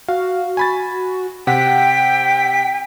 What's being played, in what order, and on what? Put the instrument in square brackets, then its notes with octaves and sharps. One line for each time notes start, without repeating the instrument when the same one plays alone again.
[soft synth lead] F#4 [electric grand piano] F5
[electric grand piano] G#5 B5 A6
[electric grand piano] C3 F#5 [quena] G5 [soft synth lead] B6